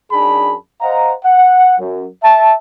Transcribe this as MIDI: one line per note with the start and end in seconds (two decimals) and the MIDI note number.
0.12 0.55 42
0.12 0.55 62
0.12 0.55 63
0.12 0.55 68
0.12 0.55 81
0.12 0.55 83
0.81 1.14 72
0.81 1.14 75
0.81 1.14 77
0.81 1.14 78
0.81 1.14 82
1.24 1.79 78
1.79 2.06 42
2.23 2.55 76
2.23 2.55 81